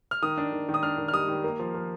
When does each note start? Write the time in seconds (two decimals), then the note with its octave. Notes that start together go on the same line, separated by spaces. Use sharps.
0.11 F6
0.23 D#3 D#6
0.38 D4
0.52 D#3
0.69 D#3
0.74 D#6
0.83 D4 F6
0.98 D#3
1.08 F6
1.13 G3 D#6
1.28 D#3
1.44 A#3
1.59 F3
1.74 F3